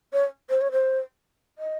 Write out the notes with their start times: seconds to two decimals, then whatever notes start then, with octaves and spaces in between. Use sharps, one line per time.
0.13 C#5
0.50 C5
0.61 C#5
0.72 C5
1.58 D#5